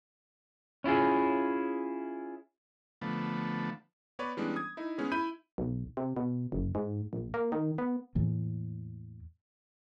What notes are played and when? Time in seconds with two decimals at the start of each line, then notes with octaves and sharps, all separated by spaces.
0.84 C#4 E4 F4 G#4
3.01 D3 F3 A3 B3
4.19 B3 B4 C#5 D5
4.37 E3 G3 G#3 B3 C#4 D4
4.56 D#6 G#6
4.77 D#4 E4
4.98 G#3 B3 C#4 G#4
5.12 E4 B5 G6 D#7
5.58 B1
5.97 C3
6.17 B2
6.52 F#1
6.75 G#2
7.13 A#1
7.34 A#3
7.52 D#3
7.78 B3
8.15 E2 A2 E3 A#3